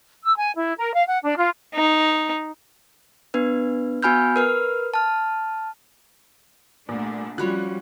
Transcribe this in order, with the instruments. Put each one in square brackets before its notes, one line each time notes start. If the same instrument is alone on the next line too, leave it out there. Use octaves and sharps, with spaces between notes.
[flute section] E6
G#5
E4
A#4
F5
F#5
D4
F4
[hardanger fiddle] D#4
[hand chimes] B3 D4 B4
B3 F#4 G#5 B5 F6 G6
A#4 B4 F6
A5 F6
[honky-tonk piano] C2 A#2 [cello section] A3 D4
[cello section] F3 G3 C#4 [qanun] F4 F#4 C#5 [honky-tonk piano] B5 F#6